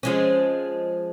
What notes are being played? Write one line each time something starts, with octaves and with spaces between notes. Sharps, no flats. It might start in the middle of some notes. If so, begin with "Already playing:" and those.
F3 G#3 C#4